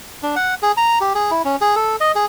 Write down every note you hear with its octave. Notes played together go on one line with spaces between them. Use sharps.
D4
F#5
G#4
A#5
G4
G#4
E4
C#4
G#4
A4
D#5
G#4